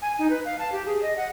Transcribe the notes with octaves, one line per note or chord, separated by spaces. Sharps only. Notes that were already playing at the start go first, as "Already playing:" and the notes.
G#5
D#4
B4
F5
A5
G4
G#4
D#5
F#5